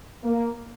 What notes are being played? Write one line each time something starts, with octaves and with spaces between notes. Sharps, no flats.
A#3